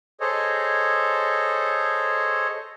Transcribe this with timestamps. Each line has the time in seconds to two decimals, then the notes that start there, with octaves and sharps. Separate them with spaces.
0.21 G#4 A4 C5 C#5 D#5